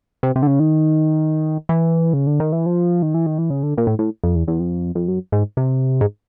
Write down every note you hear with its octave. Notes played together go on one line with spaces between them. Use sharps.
C3
C3
D3
C#3
D#3
E3
C#3
D3
D#3
E3
F3
D#3
E3
D#3
E3
C#3
D3
A#2
A2
A2
F2
E2
E2
F2
F2
F#2
G#2
C3
G#2